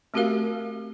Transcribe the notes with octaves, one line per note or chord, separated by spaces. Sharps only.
A3 C4 F#4 G4 A#4 F5